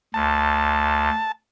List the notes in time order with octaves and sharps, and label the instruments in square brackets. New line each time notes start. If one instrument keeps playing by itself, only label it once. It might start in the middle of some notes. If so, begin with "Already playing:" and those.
[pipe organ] D2 [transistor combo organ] A5